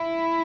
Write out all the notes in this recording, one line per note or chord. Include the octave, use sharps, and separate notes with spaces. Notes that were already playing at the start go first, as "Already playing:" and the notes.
Already playing: E4